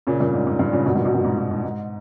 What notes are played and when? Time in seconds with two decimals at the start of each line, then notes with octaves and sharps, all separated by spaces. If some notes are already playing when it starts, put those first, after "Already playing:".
0.07 A#2 C#3
0.20 G2 A#2
0.33 G#2
0.47 G#2
0.59 G2 A#2
0.72 A#2 C#3
0.86 G#2 B2
0.95 G2 A#2
1.05 G#2 B2
1.14 G2 A#2
1.24 G#2
1.38 G#2
1.51 G#2
1.63 G#2